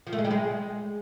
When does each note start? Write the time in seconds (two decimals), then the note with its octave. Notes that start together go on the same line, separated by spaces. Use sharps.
0.07 F3
0.13 A3
0.19 G#3
0.25 G3
0.31 G#3